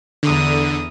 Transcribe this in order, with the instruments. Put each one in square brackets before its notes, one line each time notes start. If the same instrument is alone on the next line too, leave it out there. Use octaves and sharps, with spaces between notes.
[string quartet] E2 A#5 D#6 [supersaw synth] D3